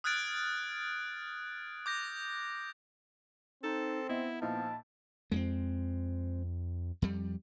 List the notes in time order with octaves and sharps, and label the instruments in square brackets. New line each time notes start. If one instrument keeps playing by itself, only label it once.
[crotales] D#6 F6 F#6 G#6 A6 D7
D6 G6 A#6
[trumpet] C4 [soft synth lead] D#4 [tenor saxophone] A4
[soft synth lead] B3 [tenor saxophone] E4 [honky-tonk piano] D#5
[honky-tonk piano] A#2 D#4 E4 [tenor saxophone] F3 [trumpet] A5
[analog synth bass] F2 [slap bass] G#3 A#3 C4
[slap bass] F2 G3